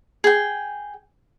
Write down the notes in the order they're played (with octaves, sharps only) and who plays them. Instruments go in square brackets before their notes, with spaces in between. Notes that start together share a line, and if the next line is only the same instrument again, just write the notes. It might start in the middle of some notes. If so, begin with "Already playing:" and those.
[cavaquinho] G#4 G5